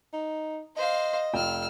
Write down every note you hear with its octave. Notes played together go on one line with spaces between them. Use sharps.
D#4
C5 D#5 F5
F1 F4 G5 E6 F6